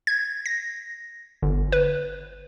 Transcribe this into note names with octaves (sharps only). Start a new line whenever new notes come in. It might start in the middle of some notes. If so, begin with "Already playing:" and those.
G#6
A#6
G1
B4